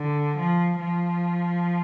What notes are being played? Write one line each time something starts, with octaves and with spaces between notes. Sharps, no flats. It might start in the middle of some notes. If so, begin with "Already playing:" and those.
Already playing: D3
F3
F3